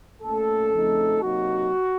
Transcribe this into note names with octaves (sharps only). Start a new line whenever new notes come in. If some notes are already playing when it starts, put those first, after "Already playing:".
A#2 A3 C#4 A4
F2 C#3 F3 A3 D#4
C3 F#3 A#3 D#4 F#4